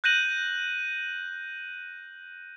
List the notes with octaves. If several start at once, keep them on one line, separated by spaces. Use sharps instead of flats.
F#6 G6 A#6 D#7 F#7